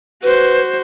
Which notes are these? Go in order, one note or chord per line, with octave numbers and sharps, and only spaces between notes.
F#4 B4 C5